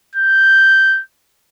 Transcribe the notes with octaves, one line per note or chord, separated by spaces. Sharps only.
G6